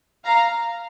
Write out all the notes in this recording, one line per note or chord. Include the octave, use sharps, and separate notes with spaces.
F5 A#5